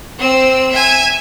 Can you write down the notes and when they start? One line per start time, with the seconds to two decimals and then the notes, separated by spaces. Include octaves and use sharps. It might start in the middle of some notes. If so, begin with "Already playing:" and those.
0.19 C4 E6
0.71 E5 G#5